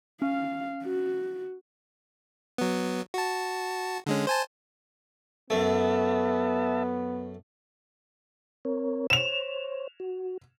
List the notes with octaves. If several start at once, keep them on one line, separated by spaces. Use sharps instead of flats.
C#4 F5
F#4
F#3 B3
F#4 A5
D3 G#3 C#4
C5 G#5 A5
F#2 A3 B3 E5 A5
C4 A#4 C#5
C5 C#5 E7 F7
F#4